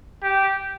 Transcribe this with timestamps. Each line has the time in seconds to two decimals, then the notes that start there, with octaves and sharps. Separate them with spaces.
0.23 G4